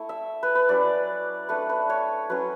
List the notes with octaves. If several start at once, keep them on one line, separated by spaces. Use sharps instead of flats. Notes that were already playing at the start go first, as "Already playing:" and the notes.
Already playing: A3 E4
E5
B4
B4
F#3 C#4 E4 D5
A3 D4 B4
B4
C#5
F#3 C#4 E4 B4